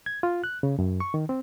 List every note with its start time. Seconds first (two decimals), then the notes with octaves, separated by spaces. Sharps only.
0.06 G#6
0.23 F4
0.44 F#6
0.63 C#3
0.79 F#2
1.00 C#6
1.14 D#3
1.29 C4